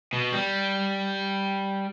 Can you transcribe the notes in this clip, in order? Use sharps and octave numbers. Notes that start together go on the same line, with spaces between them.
B2
G3